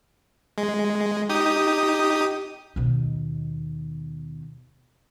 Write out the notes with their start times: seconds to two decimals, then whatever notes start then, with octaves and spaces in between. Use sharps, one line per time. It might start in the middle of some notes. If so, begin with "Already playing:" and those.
0.58 G#3
1.29 D#4 G4 D#6
2.76 D#2 B2